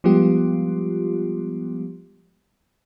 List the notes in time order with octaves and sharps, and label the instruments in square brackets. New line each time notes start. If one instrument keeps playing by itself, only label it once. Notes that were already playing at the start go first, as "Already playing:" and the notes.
[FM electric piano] F3 G3 G#3 B3 F4 G4